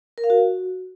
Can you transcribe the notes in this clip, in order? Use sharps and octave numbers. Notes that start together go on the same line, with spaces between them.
A#4
F5
F#4